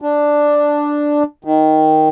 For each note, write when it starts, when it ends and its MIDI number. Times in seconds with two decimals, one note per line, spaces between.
0.02 1.23 62
1.45 2.09 51